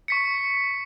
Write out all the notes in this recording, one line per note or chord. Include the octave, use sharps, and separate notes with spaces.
C#6 B6 C#7